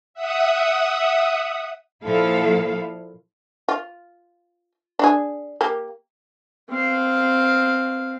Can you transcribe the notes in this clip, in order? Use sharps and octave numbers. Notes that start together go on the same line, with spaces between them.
E5 F#5 D#6
A#2 F3 E4 A4 F5
F4
D4 G#4
A#3 G4
C4 F5